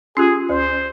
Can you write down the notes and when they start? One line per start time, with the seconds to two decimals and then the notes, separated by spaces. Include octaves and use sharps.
0.17 C#4 F4 G4 G#4
0.50 D2 C5